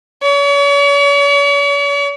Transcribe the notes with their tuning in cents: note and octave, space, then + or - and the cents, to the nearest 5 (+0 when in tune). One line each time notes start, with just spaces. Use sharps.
C#5 +40